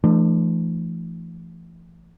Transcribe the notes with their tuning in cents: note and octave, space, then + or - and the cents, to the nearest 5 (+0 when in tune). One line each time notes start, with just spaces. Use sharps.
E3 +45 A3 +0 D4 +35